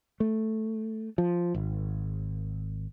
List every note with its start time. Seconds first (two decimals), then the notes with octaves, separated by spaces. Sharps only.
0.20 A3
1.18 F3
1.54 G#1